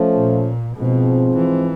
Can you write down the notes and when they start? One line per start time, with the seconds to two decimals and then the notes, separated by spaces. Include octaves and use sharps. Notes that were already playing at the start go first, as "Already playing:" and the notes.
Already playing: F3 A3 C#4
0.15 A#2
0.76 G#2 B2 F3 G#3 C4
1.37 E3